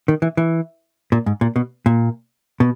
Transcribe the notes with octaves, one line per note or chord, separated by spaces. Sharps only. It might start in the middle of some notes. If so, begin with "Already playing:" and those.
D#3
E3
E3
A#2
G#2
A#2
B2
A#2
B2